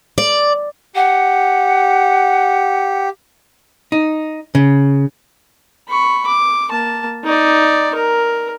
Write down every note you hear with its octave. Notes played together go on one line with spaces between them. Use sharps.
D5
G4 F#5
D#4
C#3
B5 C#6
D6
A#3 A5
D#4 D5
A#4